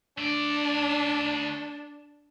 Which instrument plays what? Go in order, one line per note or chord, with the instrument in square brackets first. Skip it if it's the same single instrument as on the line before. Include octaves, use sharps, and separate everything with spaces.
[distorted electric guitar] A3 D5 [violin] D4